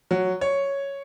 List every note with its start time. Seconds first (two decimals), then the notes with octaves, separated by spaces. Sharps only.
0.11 F#3
0.41 C#5